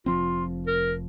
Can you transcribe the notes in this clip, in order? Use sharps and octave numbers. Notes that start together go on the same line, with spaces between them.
F1 F3 C4 F4
A#4